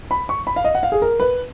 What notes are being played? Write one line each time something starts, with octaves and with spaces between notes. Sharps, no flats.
B5
C#6
B5
F5
D#5
F#5
F5
G#4
A#4
B4